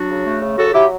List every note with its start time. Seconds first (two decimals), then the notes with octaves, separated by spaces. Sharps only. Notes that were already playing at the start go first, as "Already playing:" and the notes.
Already playing: F#3 D4 F#4
0.09 C#3
0.26 A3
0.42 C#3
0.58 F#3 F#4 A4
0.74 F#3 E4 G4